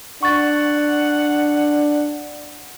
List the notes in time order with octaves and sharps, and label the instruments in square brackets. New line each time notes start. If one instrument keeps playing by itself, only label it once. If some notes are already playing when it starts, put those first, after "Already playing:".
[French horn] D4 [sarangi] F#5 [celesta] C#6 A6